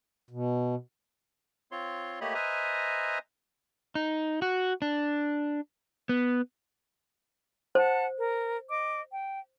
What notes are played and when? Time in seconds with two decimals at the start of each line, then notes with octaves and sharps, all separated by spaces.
0.31 B2
1.71 C4 F4 C#5 C6
2.21 A3 A#3 G4 C#5 D#5 B5
2.34 B4 C5 D#5 E5 G#5 A#5
3.95 D#4
4.42 F#4
4.82 D4
6.09 B3
7.75 C5 F#5 A5
8.18 A#4
8.69 D#5 D6
9.11 G5